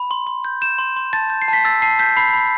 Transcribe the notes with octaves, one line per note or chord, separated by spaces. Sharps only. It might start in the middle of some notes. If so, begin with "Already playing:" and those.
Already playing: B5
C6
C6
G6
G6 E7
C6
C6
A5 A6
G6
C7
A5 B6
E6 A6
A5 C7
G6 B6
B5 C7
B5